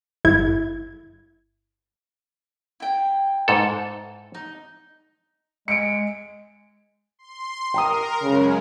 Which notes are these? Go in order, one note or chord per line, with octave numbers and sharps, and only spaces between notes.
G1 E4 G#6
E4 G5
G#2 A4
D#4
G#3 C#7 D7
C6
A#4 G5 A#5 D#6
F#2 C#3 G#3